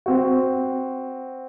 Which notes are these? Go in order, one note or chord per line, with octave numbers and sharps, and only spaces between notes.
C4 F#4